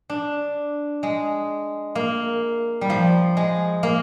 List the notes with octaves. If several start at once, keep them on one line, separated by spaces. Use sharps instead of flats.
D4
G#3
A#3
G3
F3
G#3
A#3